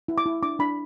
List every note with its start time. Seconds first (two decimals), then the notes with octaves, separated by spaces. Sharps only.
0.08 E4
0.18 D6
0.26 E4
0.43 D4 D6
0.59 D4 B5